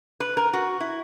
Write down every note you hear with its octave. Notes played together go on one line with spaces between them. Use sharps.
B4
A#4
F#4
E4